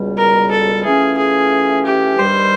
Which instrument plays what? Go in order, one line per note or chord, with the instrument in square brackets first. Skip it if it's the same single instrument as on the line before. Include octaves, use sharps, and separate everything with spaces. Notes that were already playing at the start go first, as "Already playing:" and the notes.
Already playing: [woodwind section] C#2 B2 G3
[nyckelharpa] A#4
A4
[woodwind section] E3 A3 C#4 F4 [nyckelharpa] G#4
[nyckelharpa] G#4
G4
[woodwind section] G2 D#3 G3 [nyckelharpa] C5